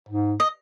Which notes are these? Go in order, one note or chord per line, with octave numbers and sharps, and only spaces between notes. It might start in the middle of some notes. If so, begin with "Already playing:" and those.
G#2
D#5